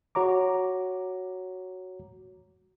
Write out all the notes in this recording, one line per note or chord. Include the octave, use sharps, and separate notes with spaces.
F#4 C#5 A#5 D6